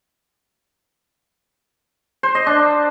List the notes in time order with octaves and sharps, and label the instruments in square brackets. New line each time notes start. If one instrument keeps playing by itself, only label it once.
[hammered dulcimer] C5
D#5
D4